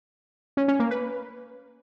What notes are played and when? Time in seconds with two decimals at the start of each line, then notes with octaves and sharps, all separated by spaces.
0.57 C#4
0.68 C#4
0.80 A#3
0.91 B4